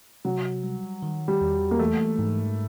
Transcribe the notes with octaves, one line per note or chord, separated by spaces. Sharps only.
C3 F#3
G3
D#3
G3
E2
A#3
E3 A3
G#2